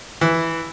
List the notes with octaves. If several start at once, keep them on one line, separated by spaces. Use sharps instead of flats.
E3